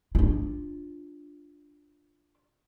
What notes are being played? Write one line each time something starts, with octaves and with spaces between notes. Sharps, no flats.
D4 F4